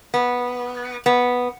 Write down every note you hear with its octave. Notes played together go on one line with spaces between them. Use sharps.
B3
B3